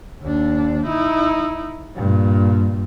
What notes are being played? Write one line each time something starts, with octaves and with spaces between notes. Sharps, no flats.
D#2 D4
D#4 E4
G2 A#2